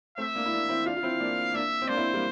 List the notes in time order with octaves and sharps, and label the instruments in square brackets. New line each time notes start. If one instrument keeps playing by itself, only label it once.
[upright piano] A3 C4 [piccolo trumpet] E5
[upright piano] A#3 D4
E4
A#3 D4
C4 E4
[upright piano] D4 F4 [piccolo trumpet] F5
[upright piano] F4
C4 E4
A#3 D4
[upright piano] A#3 D4 [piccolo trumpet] E5
[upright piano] C4
[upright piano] A#3 D4 [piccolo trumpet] C5
[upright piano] C4 E4
G3 A#3